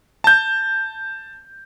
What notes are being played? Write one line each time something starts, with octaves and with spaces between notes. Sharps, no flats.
A5 G6